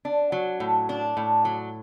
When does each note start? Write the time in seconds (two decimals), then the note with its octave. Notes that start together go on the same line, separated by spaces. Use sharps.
0.05 D4
0.32 F#3
0.60 A2
0.89 D4
1.17 A2
1.45 F#3